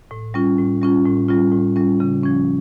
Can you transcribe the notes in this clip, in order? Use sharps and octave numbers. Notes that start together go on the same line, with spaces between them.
A2
G3 C#4 F4
A2
G3 C#4 F4
A2
G3 C#4 F4
A2
G3 C#4 F4
C#3
F3 C#4